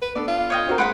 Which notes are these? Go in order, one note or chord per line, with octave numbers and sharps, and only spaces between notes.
B4
B3 D4 A4 D5
F4
C#5 D#5 G5
C4 F#4 A#4
G#3 B4 F#5 B5 C6 D7